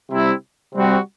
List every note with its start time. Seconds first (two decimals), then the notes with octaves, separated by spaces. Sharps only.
0.10 C3 G3 C4 E4
0.74 C3 G3 C4 F#4